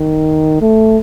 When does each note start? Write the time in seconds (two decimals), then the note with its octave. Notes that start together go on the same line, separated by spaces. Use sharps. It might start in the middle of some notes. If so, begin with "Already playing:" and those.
Already playing: D#3
0.61 A3